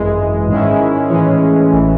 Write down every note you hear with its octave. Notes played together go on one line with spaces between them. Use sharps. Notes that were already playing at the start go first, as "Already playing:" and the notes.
Already playing: G#1 F#2 E3 G#3
G#2 D#3 G#3 C#4 E4
A2 E3 G#3 C#4
A1 A2 E3